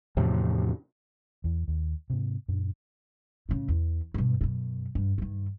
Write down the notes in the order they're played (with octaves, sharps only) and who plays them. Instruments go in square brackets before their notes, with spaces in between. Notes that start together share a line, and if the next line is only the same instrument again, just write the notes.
[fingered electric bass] E2 A2 C3 F3
E2 E3
D#2
G#2 C3
F#2 A#2 D4
[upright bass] A2 C#3
E2
G2 B2
F#2 B2
G2
G2 D#3